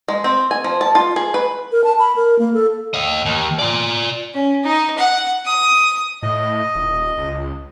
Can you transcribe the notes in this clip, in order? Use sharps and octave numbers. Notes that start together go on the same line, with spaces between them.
G#3
C4
G#5
F3
A5
F4
G#4
B4
A#4
A5
B5
A#4
A#3
A4
D#5 F5
D#2
F4 D5
C#4
D#4
F#5
D#6
A2 D#5
D#1
C#2